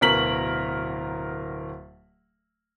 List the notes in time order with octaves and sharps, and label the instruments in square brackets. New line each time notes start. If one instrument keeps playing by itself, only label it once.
[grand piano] D1 B2 A#4 B6 F#7